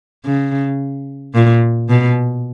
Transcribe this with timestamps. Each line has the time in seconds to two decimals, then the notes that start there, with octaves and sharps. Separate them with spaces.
0.25 C#3
1.34 A#2
1.89 B2